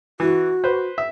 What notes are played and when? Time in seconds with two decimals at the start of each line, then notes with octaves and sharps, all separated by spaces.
0.20 E3 F#4
0.64 B4 C5
0.98 E5